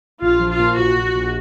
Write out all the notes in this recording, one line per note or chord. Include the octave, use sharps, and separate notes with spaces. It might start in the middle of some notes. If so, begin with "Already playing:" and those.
A#1 F4
F3
F4
A#2
A#1 F#4
A#1
A#1